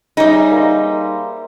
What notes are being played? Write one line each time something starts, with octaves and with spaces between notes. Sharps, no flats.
G3 D#4 G#4 C#5 E5
A#3 C5